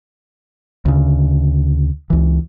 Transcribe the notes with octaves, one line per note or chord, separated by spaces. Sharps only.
D2 C#3
C#2 E3